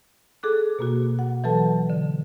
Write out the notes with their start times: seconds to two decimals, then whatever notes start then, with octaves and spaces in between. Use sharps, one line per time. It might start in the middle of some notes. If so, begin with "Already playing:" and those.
0.43 G#4 A4 D6 F#6
0.79 B2 A#3 F#4
1.19 F#5
1.44 E3 F#3 A4 B4 A5
1.90 D3